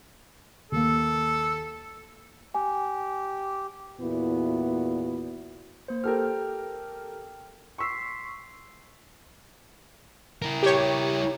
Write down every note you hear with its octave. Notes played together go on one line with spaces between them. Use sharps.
D#2 A#3 A4
G4 G#5
E2 A#2 B3 E4 F#4
A#3 C5
G4 A4 A#4 G5 F6
C6 C#6 E6 B6 C7
E4 A#4
G4 C#5